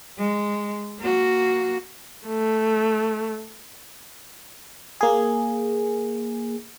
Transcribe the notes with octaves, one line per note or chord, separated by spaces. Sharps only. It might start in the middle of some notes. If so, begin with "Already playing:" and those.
G#3
A#3 F#4
A3
A#3 G#4